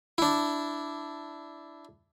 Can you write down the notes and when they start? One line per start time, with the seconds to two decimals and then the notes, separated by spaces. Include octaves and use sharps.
0.18 D4 E4